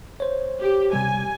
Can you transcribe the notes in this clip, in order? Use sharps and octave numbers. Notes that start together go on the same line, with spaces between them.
C5 C#5
G4
C3 G3 G#5